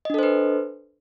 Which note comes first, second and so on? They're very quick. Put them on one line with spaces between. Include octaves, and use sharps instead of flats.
D#5 D4 A4 C5 B4